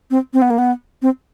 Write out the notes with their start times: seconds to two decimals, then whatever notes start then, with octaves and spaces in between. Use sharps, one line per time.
0.11 C4
0.34 C4
0.42 B3
0.50 A#3
0.58 B3
1.02 C4